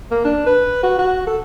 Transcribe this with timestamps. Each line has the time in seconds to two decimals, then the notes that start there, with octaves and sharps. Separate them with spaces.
0.11 A#3
0.25 D4
0.46 B4
0.83 F#4
0.98 F#4
1.27 A4